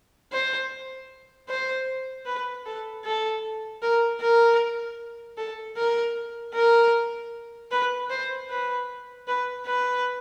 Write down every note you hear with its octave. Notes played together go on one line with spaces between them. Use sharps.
C5
C5
B4
A4
A4
A#4
A#4
A4
A#4
A#4
B4
C5
B4
B4
B4